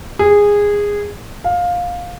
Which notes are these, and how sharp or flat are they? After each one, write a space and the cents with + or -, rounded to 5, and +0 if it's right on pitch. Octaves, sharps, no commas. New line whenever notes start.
G#4 -15
F5 +15